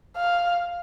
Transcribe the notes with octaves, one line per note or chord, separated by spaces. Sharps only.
F5